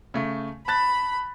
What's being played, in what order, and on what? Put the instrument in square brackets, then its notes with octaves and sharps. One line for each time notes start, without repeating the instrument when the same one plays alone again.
[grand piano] C#3 A3
[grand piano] A5 F#6 A6 [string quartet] B5